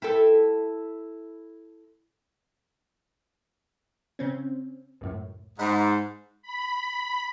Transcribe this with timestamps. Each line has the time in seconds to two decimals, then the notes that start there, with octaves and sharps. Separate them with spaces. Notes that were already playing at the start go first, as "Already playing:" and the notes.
0.02 E4 G4 A4
4.19 C#3 C4 C#4
5.01 C#2 F#2 A2
5.59 G#2 D#5 F#5 B5
6.42 B5